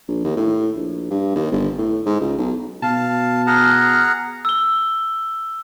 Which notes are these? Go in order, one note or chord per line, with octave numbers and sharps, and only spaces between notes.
A#1
D#2
A2
A#1
G2
D#2
G1
A2
G#2
C#2
B1
B2 F5 A5
G#4 F#5 A#5 F6
E6 G7